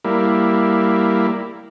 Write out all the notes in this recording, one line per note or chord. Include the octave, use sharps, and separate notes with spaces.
G3 A#3 E4